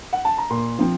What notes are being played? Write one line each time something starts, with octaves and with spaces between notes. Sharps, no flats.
F#5
A5
A#5
A#2 C6
F3 C4